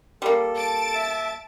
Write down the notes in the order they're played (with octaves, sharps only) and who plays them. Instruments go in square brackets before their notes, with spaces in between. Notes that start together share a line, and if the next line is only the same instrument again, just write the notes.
[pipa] G3 A#3 [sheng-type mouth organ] A4
[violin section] A5 A6 D7
[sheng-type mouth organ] E5